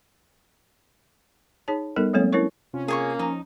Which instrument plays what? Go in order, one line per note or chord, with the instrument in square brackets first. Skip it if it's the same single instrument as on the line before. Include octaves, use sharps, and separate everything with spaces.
[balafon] D#4 G#4 C#5 A5
G3 B3 D#4 A4 A#4
F#3 G#3 A#3 C4 A4 C#5
C#4 E4 A#4 C#5 C#6
[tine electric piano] C3 C4 F4 [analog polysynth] C#4
[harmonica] A#3 [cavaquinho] G#4 G#5 C#6
[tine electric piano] F3 A#5 [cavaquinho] D#4